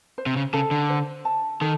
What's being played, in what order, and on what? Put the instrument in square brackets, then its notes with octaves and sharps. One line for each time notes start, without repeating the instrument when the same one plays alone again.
[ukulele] C5
[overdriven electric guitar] C3
C#3
[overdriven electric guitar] C#3 [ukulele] A4
[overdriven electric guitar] D3
[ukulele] C5
A5
[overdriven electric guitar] D#3 [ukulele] A4